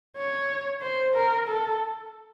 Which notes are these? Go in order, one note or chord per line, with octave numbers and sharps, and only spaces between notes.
C#5
C5
A#4
A4